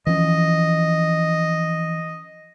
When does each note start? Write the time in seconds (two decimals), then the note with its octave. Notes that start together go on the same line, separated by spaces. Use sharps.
0.07 E3 F3 C#4 D#5